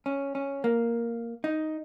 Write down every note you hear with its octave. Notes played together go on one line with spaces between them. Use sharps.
C#4
C#4
A#3
D#4